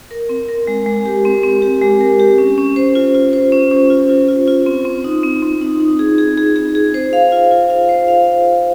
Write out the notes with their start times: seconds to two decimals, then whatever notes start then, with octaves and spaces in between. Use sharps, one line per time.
0.11 A#4
0.29 C4
0.49 A#4
0.67 G#3
0.86 G#3
1.06 G4
1.25 C4
1.43 C4
1.62 G4
1.81 G#3
2.01 A#4
2.19 G4
2.38 C#4
2.58 C#4
2.76 C5
2.95 F4
3.15 F4
3.33 C5
3.52 C#4
3.71 C#4
3.90 F4
4.09 F4
4.29 F4
4.48 F4
4.66 C4
4.85 C4
5.04 D#4
5.23 C4
5.42 C4
5.61 D#4
5.80 D#4
5.99 G#4
6.18 G#4
6.37 G#4
6.56 G#4
6.75 G#4
6.94 C5
7.13 F5
7.32 F4
7.51 F4
7.70 F5
7.89 C5
8.08 F5